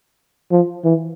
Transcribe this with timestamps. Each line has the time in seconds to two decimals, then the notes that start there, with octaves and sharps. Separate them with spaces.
0.51 F3
0.85 E3